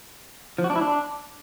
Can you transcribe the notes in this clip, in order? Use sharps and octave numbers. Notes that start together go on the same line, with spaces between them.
F3
F#4
D4
E4
D4